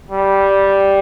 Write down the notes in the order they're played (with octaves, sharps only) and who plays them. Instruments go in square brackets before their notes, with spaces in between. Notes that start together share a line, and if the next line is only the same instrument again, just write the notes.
[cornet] G3